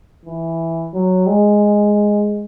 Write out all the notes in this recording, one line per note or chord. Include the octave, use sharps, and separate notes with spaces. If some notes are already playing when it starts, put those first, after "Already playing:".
E3
F#3
G#3